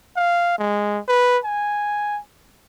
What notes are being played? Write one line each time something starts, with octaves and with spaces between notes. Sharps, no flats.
F5
G#3
B4
G#5